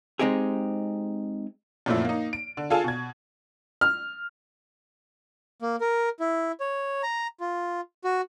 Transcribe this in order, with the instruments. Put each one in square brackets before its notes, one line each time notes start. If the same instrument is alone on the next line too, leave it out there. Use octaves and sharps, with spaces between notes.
[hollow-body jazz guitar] G#3 C4 D#4 G4 G#4
[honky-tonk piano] F#2 A#2 F3 A3 E4
A#3 D#4
D7
D3
F4 G#4 A4 F5 G#5 A5
B2 G#6
[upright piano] F6
[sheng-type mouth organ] A#3
A#4
E4
C#5
A#5
F4
F#4